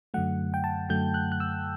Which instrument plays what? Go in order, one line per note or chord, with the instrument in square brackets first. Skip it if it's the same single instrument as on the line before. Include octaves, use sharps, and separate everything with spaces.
[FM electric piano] F#2 D3 F#3 A3 F#5
G5
A5
F#2 D3 F#3 A3 G6
F#6
F#6
E6